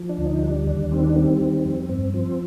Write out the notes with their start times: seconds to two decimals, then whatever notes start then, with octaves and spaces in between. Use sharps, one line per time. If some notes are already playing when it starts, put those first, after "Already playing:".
Already playing: F3
0.09 D4
0.18 D2
0.26 D#4
0.43 G3 D4
0.66 D#2 D4
0.91 D#3 C4
1.04 D4
1.16 G3 C4
1.41 D#3
1.65 F2
1.89 G2 C4
2.14 F3 C4